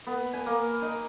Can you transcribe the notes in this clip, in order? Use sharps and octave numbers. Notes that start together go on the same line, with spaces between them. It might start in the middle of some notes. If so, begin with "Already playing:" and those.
B3
G#5
A#3
D#4